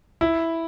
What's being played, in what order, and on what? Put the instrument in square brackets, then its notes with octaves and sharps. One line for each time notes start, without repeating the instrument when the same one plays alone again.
[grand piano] E4